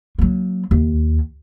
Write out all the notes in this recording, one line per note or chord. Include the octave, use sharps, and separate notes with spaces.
F#3 A#3
D#2